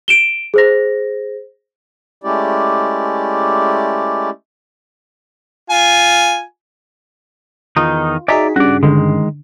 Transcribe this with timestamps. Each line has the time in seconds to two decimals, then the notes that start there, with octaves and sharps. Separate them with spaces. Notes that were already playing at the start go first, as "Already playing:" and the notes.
0.08 D7 E7 G7
0.54 G#4 C5 A#6
2.24 G#3 A3 C#4 E4 G4 D5
5.70 F4 G#5
7.77 E2 D#3 D#4 F4
8.28 D#4 F#4 G#4 D5 E5 G#5 A#5 B6
8.56 G2 C#3 F#4 D5
8.83 D3 D#3 G#3